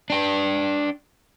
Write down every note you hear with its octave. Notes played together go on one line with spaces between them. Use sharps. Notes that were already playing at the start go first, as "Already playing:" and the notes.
D4 G5